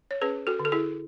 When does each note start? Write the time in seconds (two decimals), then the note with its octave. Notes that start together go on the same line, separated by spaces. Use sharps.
0.11 C#5
0.21 C#4 G#4 B4
0.47 F#4 A4
0.60 D3
0.65 A4
0.72 E4 G#4